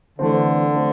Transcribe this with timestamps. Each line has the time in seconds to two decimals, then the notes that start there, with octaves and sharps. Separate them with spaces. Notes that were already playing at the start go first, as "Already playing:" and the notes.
0.18 D3 E3 A3 C4
0.72 F3 A3 C4